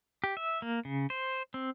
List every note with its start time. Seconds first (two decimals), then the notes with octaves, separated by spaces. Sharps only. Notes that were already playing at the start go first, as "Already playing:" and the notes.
0.24 G4
0.37 E5
0.62 A#3
0.85 C#3
1.10 C5
1.54 C4